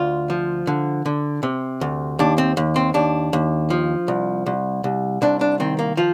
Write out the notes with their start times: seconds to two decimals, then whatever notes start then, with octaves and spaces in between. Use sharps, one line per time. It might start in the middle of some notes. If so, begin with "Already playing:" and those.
Already playing: D2 F4
0.30 F3
0.67 D3
1.06 D3
1.43 C3
1.81 D2
2.19 D#2 D4
2.38 C4
2.57 D#2
2.76 C4
2.94 D#2 D4
3.33 D#2
3.70 F3
4.08 C2
4.46 C2
4.84 C2
5.22 C2 D4
5.41 D4
5.60 D#3 C4
5.79 A#3
5.97 F3 F4